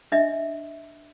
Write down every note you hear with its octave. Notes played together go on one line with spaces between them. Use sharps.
D4 D#5 E5